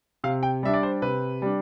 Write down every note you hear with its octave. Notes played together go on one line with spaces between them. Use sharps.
C3 F5
G5
G3 D4 E5
D5
C5
C3 B4
G3 D4